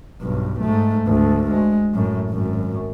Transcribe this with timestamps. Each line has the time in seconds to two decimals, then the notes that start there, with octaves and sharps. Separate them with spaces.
0.22 B1 G2
0.61 G#2 A3
1.07 D2 G#2
1.50 G#3
1.94 F#2 A2
2.30 G#1 F#2